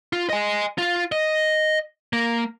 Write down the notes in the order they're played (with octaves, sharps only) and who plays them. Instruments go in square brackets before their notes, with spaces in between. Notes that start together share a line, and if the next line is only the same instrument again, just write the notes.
[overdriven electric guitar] F4
D#5 G#5
F4
D#5
A#3